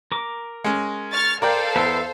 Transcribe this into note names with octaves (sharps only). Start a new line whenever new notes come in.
A#4 D6
G#3 C#4
C#6 F6 A6
A4 A#4 C5 D5 F5 G5
E2 B4 E5 C6